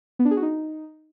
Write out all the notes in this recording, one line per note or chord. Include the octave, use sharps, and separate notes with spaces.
B3
D4
G#4
F#4
D#4